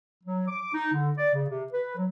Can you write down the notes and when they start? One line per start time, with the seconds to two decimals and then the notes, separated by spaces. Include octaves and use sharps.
0.24 F#3
0.48 D6
0.74 D#4
0.94 D3
1.18 D5
1.34 C#3
1.49 C3
1.72 B4
1.97 F#3